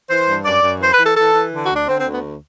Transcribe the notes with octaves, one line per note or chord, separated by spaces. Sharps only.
E3 C5
G2
F#2 D5
F#2
E3 C5
B4
E3
A4
E3 A4
E3
D3
F#4
D2
D4
D3 C4
C4
D2
B3